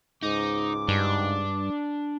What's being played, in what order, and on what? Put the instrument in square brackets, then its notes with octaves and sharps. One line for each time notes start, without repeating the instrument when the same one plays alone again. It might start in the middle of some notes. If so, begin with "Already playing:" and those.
[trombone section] C#2 G#2 [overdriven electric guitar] D#4 [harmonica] D6
[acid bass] G2 [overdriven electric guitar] D4